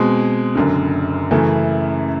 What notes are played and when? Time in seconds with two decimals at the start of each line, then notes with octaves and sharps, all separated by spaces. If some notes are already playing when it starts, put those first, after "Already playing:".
Already playing: B2 G#3 C4
0.55 F#1 F#2 D3
1.31 F#2 C#3 E3 A3